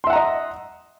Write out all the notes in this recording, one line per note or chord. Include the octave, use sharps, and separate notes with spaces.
D#5 E5 F#5 A#5 C6